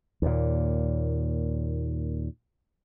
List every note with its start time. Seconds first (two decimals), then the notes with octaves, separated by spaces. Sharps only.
0.22 D#2 A#2